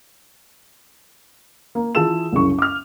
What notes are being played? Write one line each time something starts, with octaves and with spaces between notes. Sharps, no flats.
A#3
E3 F4 G#4 A5 E6 E7
C2 F#2 C#3 C#6
D6 F6